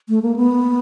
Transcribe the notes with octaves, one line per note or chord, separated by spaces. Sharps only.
A3
A#3
B3